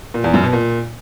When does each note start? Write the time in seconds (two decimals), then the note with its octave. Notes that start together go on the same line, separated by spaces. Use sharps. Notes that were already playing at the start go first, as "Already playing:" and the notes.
0.14 A#2
0.24 E2
0.34 F#2
0.43 B2
0.53 A#2